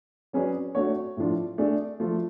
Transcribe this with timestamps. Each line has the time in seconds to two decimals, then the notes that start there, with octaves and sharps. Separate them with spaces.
0.33 F#3 C#4 G#4 B4 D5
0.75 A3 D4 F#4 C#5
1.17 A2 F3 A3 D4 F4
1.58 A3 D4 G#4 D5
2.00 F3 A3 F4